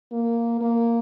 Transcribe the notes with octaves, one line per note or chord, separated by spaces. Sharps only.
A#3
A#3